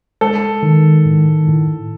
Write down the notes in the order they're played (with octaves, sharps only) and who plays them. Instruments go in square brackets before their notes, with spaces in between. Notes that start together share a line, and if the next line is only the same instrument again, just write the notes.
[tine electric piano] G#3 [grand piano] A4
[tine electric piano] D#3
A2
A2